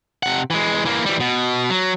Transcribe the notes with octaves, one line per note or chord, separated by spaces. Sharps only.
C3 F#5
E3 G#3
E3 A#3
E3 G3
B2
F#3